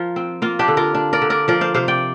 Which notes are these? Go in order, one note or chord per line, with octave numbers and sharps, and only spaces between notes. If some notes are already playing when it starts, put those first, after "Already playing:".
Already playing: F3 F4 A#4
C4
A#3 F4
D4 G4
D3
F4 A#4
D4
A#4 D5
D3
A#4 D5
F3 A#4 D5
C5 F5
C3 C5 F5
D5 G5